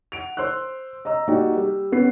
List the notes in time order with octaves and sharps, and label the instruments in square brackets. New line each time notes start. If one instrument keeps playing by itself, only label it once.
[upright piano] F#5 D7 F7
C5 C6 E6 F#6
D#5 A#5 E6
G3 A#3 D#4 F#4 G4 D5
G3
B3 C#4 C7